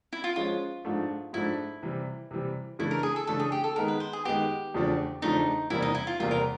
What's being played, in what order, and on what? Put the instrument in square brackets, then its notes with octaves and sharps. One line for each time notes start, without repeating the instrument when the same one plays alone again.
[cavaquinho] E4
F4
[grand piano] F3 G#3 C#4 [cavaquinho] F4
[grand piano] G#2 F3 A3 D4
[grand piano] G#2 F3 A3 D4 [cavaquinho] E4
[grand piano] C3 E3 G3
C3 E3 G3
[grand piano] C#3 E3 A3 D4 [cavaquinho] E4
[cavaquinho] A#4
G#4
A4
[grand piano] C#3 E3 A3 D4 [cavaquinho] A4
[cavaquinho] G#4
G4
A4
[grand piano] D#3 G#3 B3 [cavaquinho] A#4
[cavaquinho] B4
C5
G#4
[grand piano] D#3 G#3 B3 [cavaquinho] G4
[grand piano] E2 C#3 F3 A3 D4
[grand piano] E2 C#3 F3 A3 D4 [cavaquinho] D#4
[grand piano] E2 C3 E3 G3 A#3 [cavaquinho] E4
[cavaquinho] D#4
E4
F4
[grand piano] E2 C3 E3 G3 A#3 [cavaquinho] F4
[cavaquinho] A#4